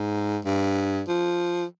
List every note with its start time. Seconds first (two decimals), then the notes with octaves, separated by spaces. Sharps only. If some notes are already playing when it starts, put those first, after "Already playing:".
Already playing: G#2
0.45 G2
1.08 F3